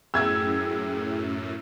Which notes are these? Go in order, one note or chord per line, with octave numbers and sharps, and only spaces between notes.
F#2 A2 G#4 G5 E6 G#6